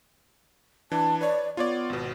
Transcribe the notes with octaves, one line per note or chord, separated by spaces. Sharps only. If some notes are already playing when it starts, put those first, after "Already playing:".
E3 D4 A5
B4 C#5 D5
B3 F4 C#5 D5
G#1 B2